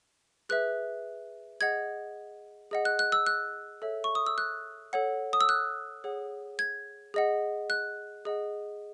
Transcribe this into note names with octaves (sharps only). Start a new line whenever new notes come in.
G#4 B4 E5 F#6
G#4 D#5 F#5 G#6
G#4 D#5 F#5
F#6
F#6
E6
F#6
A4 C#5 E5
C#6
D#6
E6
F#6
A4 C#5 F#5
D#6
E6
F#6
G#4 C#5 F#5
G#6
G#4 D#5 F#5
F#6
G#4 D#5 F#5